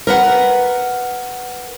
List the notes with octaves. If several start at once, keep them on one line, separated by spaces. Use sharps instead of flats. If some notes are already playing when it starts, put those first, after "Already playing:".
A#4 B4 F#5